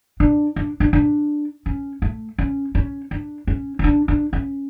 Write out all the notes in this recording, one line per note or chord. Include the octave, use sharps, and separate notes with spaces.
D4
D4
D4
D4
C#4
A3
C#4
C#4
D4
C#4
C#4
D4
D4
C#4